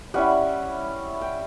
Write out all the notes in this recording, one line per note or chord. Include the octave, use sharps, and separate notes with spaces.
G3 C#4 E4 F#5
G5